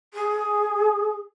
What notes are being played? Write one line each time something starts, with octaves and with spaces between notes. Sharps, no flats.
G#4